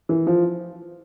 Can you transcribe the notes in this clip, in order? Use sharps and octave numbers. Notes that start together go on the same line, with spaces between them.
E3
F3